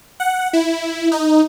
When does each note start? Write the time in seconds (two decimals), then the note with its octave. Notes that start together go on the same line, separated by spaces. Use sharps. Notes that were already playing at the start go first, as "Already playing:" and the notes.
0.20 F#5
0.53 E4
1.12 D#4